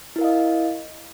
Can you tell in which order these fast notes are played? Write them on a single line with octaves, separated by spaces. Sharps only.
E4 A#4 F5 D#5